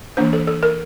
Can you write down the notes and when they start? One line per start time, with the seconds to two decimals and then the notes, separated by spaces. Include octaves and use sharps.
0.17 E3 A#3 D4 C5
0.33 A4
0.47 A4
0.63 A#4